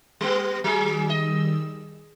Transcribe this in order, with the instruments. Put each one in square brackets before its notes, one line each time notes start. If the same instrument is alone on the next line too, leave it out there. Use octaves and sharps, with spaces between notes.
[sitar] G3 B3
[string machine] D#3 G3 E6 [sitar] F#3 G#4
[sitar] D#5